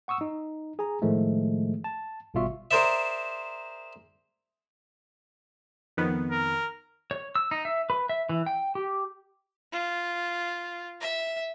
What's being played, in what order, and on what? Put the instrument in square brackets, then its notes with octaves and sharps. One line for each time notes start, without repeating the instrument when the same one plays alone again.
[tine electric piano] F#5 C#6 D#6 E6
D#4
G#4 G#5 A#5
A2 D#3 F3 G#3 A3
A5
G#1 B2 G3 F4 E5 C#6
[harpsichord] G#4 A#4 C5 D5 E5
[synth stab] F2 D#3 B3
[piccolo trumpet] A#4
[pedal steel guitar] C#5
E6
D#4
E5
B4
E5
E3
G5
G4
[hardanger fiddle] F4
E5